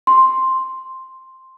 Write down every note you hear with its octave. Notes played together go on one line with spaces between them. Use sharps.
C6